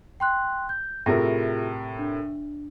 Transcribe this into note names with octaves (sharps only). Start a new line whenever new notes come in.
G5 C6 F#6
G6
A2 C3 F4 G#4 A#4 A#6
D4